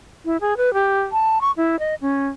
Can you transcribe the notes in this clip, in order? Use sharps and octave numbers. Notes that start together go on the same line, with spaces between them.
E4
G#4
B4
G4
A5
C#6
E4
D#5
C#4